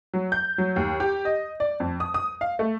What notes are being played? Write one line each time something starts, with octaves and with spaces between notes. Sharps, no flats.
F#3
G6
F#3
D#2
G4
D#5
D5
F2
D#6
D#6
F5
A3